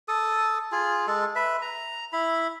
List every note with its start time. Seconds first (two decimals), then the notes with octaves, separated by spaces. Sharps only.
0.08 A4 D#6
0.72 F4 G#4
1.07 G#3 A4
1.35 B4 E5
1.62 A#5
2.13 E4 B5